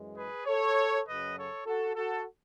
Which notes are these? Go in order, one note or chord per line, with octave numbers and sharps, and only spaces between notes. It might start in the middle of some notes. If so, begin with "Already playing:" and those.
Already playing: F#2 E3 G#3
G#4 B4
A4 C#5
F#2 C#3 F#3 B4 D#5
A4 C#5
F#4 A4
F#4 A4